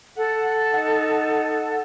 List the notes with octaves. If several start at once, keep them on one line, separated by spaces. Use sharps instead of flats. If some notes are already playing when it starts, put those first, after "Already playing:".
A4 F#5
D#4 F#5